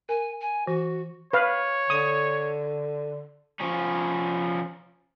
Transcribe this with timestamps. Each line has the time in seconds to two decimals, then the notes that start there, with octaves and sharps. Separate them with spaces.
0.09 A#4 G#5
0.41 G#5
0.67 E3 F#4
1.33 B4 C#5 F5
1.90 D3 D#6
3.60 F3 C#4